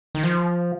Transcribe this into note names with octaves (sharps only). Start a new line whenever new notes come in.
D#3
F3